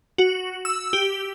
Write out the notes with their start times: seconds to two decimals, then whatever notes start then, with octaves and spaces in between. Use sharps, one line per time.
0.18 F#4
0.65 E6
0.93 G4